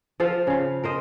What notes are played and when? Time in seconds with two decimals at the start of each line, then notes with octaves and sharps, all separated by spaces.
0.20 F3 F4 A4 F5
0.47 C#3 F5
0.84 A#4 C5 D#5